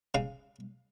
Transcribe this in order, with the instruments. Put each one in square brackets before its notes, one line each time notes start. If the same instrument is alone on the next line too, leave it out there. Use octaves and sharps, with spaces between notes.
[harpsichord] C#3 F5